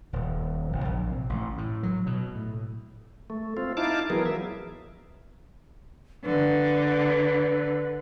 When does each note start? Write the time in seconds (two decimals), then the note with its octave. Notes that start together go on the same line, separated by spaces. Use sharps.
0.13 D#1
0.72 F#1
0.85 A#1
1.09 C3
1.29 A1
1.58 A2
1.83 F#3
2.06 B2
2.35 A2
3.30 A3
3.57 C4 F4
3.77 D#4 E4 F5 A5 D6
4.10 E3 F#3 B3 G#4 A#4
4.26 E5
6.25 D3 B4